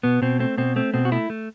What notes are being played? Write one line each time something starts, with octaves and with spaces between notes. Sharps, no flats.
B2 B3
B2 C4
A3 C4
B2 C4
A3 C4
B2 C4
F#4
A3 E4
A3